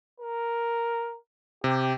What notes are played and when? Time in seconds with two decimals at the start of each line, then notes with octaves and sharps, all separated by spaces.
0.20 A#4
1.64 C3 G4